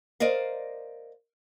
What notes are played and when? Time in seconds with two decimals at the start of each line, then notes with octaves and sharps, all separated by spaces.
0.20 A#4 C5 D5 D#5 F5